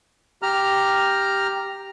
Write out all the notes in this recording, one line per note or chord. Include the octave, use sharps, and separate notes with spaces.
G4 A#5 F6